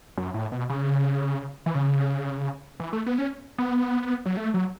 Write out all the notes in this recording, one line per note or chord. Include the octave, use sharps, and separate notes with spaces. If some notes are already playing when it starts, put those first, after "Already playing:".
F#2
A2
B2
C#3
E3
C#3
E3
A3
B3
C#4
B3
F#3
A3
F#3